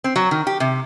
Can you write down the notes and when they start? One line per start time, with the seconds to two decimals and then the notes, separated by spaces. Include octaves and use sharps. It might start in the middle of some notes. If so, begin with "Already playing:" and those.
0.04 C4
0.16 F#3
0.31 D#3
0.47 G4
0.60 C3